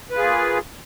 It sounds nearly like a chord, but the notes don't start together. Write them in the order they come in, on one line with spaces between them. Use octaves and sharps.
B4 F4 G#4 A#3